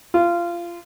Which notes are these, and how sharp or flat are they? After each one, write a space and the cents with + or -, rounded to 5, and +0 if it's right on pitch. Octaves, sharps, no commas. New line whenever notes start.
F4 -20